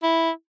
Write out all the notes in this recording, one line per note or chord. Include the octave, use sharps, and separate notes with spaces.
E4